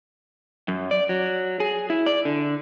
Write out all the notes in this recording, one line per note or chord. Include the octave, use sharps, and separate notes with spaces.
F#2
D5
F#3
G#4
E4
D5
D3